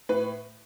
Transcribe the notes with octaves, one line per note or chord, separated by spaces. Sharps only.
A2 B4